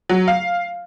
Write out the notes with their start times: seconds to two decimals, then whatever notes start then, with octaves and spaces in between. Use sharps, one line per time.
0.09 F#3
0.28 F5